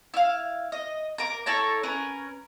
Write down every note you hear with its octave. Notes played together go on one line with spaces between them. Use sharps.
E4 F5
D#5
A#4 D6
E4 A4 C#5 A#5
C#4 A#4 B4